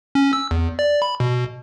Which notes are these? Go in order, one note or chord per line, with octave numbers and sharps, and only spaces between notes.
C#4
E6
E2
D5
B5
B2